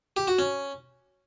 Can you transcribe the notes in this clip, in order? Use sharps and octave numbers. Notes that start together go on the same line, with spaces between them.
G4
F#4
C#4